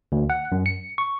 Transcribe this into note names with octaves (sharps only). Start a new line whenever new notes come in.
D2
F#5
F#2
C#7
C#6